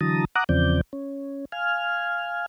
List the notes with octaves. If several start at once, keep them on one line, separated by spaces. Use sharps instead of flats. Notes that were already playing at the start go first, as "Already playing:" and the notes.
D3 E3 F#3 A5 A#5 D#6
F#5 A#5 D6 D#6 F#6
E2 C#3 F3 C4 D5 G6
C#4
F5 G#5 F6